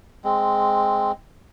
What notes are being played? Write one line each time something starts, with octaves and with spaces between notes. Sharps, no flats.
G#3 C4